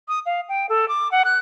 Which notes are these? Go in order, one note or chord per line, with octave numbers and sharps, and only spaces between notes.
D#6
F5
G5
A4
D6
F#5
F#6